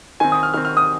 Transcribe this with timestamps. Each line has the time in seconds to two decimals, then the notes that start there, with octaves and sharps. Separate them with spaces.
0.20 D#3 C4 G#5
0.32 D#6
0.43 F6
0.54 D#3 C4 F6
0.65 F6
0.77 D#6